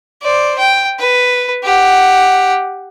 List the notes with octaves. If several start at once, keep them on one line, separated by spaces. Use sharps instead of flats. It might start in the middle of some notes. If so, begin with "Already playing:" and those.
C5 D5
G5
B4
G4 F#5